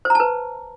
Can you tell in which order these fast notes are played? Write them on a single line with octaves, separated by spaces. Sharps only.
C5 A#5 A5 B4